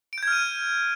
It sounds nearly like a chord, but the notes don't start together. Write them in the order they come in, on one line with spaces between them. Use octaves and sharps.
D7 G6 G#6 F6 D#7